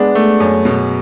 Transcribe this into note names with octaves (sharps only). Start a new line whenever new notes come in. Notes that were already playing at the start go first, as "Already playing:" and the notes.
Already playing: G#3 B3 D4
A3
F#2
B2